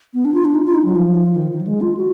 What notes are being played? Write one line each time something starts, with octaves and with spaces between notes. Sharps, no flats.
B3
D4
F4
D4
D#4
F4
D#4
F#3
F3
D#3
D#3
F#3
G#3
F4
F#4